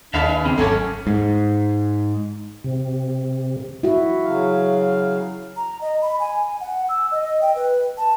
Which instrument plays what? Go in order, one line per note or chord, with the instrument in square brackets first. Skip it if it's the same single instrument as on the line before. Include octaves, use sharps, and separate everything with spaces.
[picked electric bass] D#2 [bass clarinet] D4 [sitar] D#4 G#4 B4 [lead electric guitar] E5 F5
[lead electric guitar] E2 C#3 [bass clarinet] C4
[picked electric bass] G#1 [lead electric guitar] F#2 C#4 [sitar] G#3 [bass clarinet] A4
[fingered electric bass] G#2
[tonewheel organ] C3
[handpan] E4 F#4
[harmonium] C#3 F#3 F5
[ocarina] A#5
D#5
B5
G#5
F#5
E6
D#5
G5
B4
A5